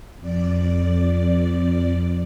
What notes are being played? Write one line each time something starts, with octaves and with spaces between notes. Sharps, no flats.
F2 D5